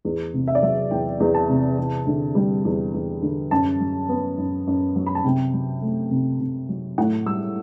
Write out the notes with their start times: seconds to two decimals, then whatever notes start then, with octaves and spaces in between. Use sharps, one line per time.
0.05 E2
0.34 C3
0.48 E5
0.55 D5
0.62 F#3 E5
0.91 E2 G5
1.20 E2
1.34 A5
1.49 C3
1.78 E2
2.07 D3
2.35 G3
2.65 E2
2.94 E2
3.22 D3
3.51 F#2 A5
3.80 F#3
4.09 B3
4.38 F#2
4.67 F#2
4.96 F#3
5.06 B5
5.15 A5
5.25 C3 G5
5.53 F#3
5.82 A3
6.11 C3
6.40 C3
6.69 F#3
6.98 A2 F#5
7.26 G3 E6